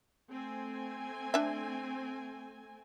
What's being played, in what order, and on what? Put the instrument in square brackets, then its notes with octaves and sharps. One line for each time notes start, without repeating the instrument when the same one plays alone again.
[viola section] A3 C4 G#5
[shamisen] D4 E5